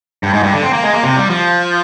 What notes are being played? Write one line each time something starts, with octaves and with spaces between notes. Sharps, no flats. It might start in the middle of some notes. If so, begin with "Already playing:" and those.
G2
G#2
G2
D3
C4
A#3
G#3
A#3
C3
G3
F3